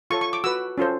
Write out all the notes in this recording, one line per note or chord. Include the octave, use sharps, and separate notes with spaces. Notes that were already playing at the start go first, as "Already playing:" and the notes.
F4 A4 C#5 C#6
C#6
D6
F#4 B4 E6
C#4 F4 A4 C5